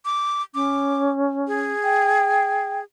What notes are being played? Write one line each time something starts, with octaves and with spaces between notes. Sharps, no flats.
D6
C#4 D6
G#4
G5